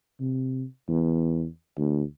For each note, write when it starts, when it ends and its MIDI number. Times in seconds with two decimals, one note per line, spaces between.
0.20 0.65 48
0.88 1.46 40
1.78 2.03 38